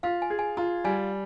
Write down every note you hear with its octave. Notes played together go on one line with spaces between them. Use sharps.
F4 F5
G#5
G#4
G#5
F4 A#5
G3 G#5